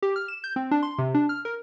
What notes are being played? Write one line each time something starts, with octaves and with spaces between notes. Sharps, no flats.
G4
F6
E7
G6
C4
D4
C6
C3
D4
F6
A#4